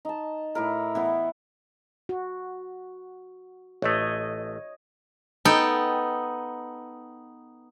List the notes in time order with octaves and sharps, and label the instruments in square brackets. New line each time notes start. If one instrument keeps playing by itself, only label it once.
[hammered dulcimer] D#4 A5
A2 E4 A#4
E3 B3 E4
[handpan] F#4
[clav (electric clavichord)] A1 A3 [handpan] C#5 D#5
[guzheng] B3 D#4 A4 G5